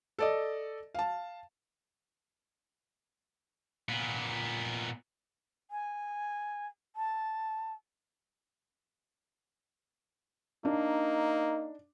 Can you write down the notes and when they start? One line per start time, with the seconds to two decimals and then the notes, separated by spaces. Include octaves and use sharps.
0.19 A4 D5 D#5
0.95 F5 A5
3.89 A#2 B3
5.71 G#5
6.96 A5
10.65 A#3 D4 D#4